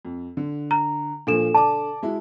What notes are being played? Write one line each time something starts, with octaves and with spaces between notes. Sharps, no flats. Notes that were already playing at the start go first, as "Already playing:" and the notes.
F2
D3
A#5
A#2 F3 D4 A4 E7
D5 A5 D6
G#3 E4 F#4